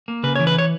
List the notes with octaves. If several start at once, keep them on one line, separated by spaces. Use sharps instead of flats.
A#3
C#3 B4
E3 C#5
B4
C#5